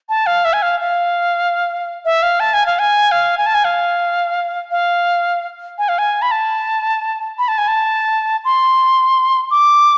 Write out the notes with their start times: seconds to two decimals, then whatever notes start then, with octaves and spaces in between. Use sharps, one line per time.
0.09 A5
0.27 F5
0.45 E5
0.53 G#5
0.62 F5
0.80 F5
2.05 E5
2.23 F5
2.40 A5
2.54 G#5
2.66 F5
2.79 G#5
3.12 F5
3.38 G#5
3.46 A5
3.54 G#5
3.65 F5
4.71 F5
5.78 G#5
5.89 F5
5.98 G#5
6.22 B5
6.31 A5
7.39 B5
7.48 A5
7.58 G#5
7.68 A5
8.45 C6
9.51 D6